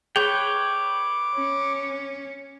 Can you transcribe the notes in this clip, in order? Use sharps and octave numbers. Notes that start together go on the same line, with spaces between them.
G#4 B4 C#5 G5 D6 G6
C#4